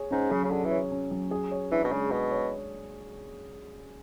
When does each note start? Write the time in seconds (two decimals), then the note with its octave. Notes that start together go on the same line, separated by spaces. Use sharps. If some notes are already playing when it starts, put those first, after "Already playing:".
Already playing: G#4 C#5
0.11 G#2 C#4
0.31 C#3 F#3
0.44 C#3
0.51 D3 G#4
0.65 E3
0.71 C#5
0.92 C#4
1.11 F#3
1.31 G#4
1.51 C#5
1.71 E3 D4
1.84 B2
1.91 C#3 G#3
2.11 B2 G#4
2.31 C#5